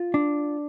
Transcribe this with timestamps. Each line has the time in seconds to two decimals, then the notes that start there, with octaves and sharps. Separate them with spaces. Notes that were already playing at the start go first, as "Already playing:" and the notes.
Already playing: F4
0.14 D4